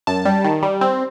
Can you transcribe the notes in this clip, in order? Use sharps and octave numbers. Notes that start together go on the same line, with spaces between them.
F#2 A5
G3
D#3
G3
C4